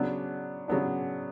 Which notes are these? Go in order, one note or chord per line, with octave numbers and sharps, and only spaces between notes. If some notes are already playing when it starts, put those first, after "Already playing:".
Already playing: C#3 F#3 B3 D4
C#3 F#3 B3 D4